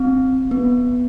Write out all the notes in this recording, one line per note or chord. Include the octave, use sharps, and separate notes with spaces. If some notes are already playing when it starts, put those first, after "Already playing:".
Already playing: C4
B3